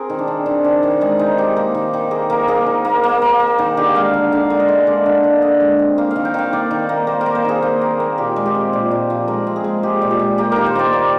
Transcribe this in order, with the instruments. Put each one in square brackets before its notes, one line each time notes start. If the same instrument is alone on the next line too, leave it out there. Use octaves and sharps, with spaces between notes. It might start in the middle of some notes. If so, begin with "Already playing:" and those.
Already playing: [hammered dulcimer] C4 G#4 A#4
D#3
D4
C4
D#3 C4
D#3 D4
D#3
G#3 D#4
C4 D#4
D#3 G4
A#3
D#3
D#3
A#3 G#4
A#3 A#4
A#3 G#4
D#3
A#3
A#3
A#3
A#3
D#3
D3 G4
G#3 F5
D3
D3 F5
G#3
D#5
G#3
D3 D5
D3
D3
D3 D#5
G#3
C4
A#3 F5
F5
D#3
G5
D#3 F5
A#3 D5
D#3
A#3
A#3 C5
A#4
A#3
C5
D#3 G#4
A#3
A#3
A#3
A#2 G4
G#3
G4
C4
A#2
A#2
F3
G#3 A#4
C4
G#4
G#3
G#3 G4
A#2
G4
G#3
A#3 G4
D#3 A#4
C5
A#3 D5
A#3